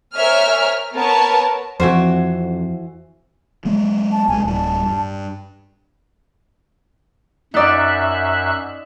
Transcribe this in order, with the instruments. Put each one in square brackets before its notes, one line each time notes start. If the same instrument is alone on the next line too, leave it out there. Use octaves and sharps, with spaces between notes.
[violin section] A#4 C5 C#5 E5 G#5 F6
B3 A#4 B4 C#5 A5
[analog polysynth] F2 [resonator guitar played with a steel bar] E3 F#4 C5
[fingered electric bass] F#3 G#3 B3
[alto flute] A5
[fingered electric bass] C2 G#3 [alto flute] G#5
[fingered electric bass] D1 G3 [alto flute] A5
[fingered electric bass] G2
[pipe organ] F#2 E5 F#6 [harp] D#4 D5